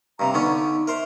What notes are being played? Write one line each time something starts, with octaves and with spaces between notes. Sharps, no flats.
G2 C3 A#5
D3 B3 C#4 D#4
A#4 C5 E5